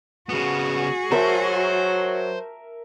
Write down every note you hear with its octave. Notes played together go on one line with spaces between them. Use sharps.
C#3 B3 F#4 G#4
F#3 A#4 C5 E5 A5